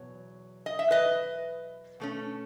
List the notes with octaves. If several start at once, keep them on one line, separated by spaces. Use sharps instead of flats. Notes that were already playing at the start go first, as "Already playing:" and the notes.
Already playing: E2 B2 F#3 C#5
D#5
E5
B4 D#5
B2 A3 C#4